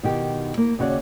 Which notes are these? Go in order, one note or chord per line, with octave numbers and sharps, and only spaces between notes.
B2 D#3 G4
A#3
D#2 C#3 F#4 C#5 D5